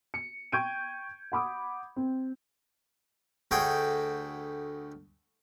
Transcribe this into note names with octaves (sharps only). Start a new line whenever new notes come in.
C#7
G5 C#6 G6 G#6 D7 D#7
F#5 B5 D6 D#6
C4
D2 A3 F#4 G#4 G5